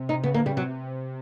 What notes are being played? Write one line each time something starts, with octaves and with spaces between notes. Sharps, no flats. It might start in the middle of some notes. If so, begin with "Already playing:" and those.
Already playing: C3
D#4
C#3 B3
D3 A#3
C#3 G3
C3 F#3